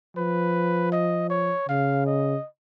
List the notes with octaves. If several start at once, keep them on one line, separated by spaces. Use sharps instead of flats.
F3 B4
D#5
C#5
C#3 F5
D#5